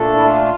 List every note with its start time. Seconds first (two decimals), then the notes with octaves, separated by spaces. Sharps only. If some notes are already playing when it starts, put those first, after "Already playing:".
Already playing: A#2 A3 D4 A4
0.15 E4
0.24 F4